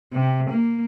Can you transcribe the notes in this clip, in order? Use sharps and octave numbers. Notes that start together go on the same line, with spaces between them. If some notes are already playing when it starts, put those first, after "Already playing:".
C3
A#3